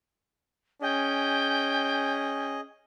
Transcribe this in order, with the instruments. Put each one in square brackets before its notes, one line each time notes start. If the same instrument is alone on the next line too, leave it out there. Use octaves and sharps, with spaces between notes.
[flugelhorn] C#4 [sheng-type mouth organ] G#4 D#5 [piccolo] G5